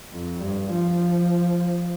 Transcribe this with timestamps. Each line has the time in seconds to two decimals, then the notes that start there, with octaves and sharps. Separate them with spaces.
0.12 F2
0.41 G2
0.70 F3